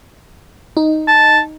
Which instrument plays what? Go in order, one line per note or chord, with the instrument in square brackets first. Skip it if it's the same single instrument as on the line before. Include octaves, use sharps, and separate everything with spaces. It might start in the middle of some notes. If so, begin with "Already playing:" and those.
[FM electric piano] D#4
[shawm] A5